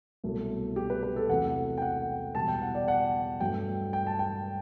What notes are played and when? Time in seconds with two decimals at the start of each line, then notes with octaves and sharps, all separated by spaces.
0.23 C2 B2 F#3 A3
0.76 G4
0.90 B4
1.03 B4
1.16 A4
1.29 E2 C3 F#3 A3 F#5
1.78 G5
1.82 F#5
2.35 E2 B2 G3 A5
2.48 G5
2.62 F#5
2.75 D5
2.88 F#5
3.40 G2 F#3 A3 G5
3.93 G5
4.07 A5
4.19 G5